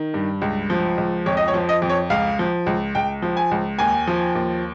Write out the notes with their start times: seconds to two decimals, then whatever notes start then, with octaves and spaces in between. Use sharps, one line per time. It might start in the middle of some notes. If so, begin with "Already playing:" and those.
Already playing: D#3
0.14 G2
0.42 C#2
0.70 F3
0.98 C#2
1.26 F2 C#5
1.37 D#5
1.48 C#5
1.54 F3
1.69 D#5
1.82 F2
1.89 C#5
2.10 C#2 F5
2.39 F3
2.66 C#2
2.95 C#2 G5
3.22 F3
3.37 G#5
3.51 C#2
3.79 D#2 G#5
4.07 F3
4.35 D#2